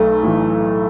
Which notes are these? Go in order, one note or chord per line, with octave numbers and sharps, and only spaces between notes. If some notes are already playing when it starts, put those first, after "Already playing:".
Already playing: B1 A3
A2 E3